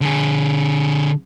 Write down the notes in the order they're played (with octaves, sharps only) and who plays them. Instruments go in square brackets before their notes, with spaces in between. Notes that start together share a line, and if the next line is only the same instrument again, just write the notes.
[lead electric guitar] D3 G#4